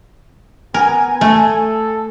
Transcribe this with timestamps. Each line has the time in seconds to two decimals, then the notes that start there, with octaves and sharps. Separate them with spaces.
0.74 B3 A#4 G#5
1.21 A3 A4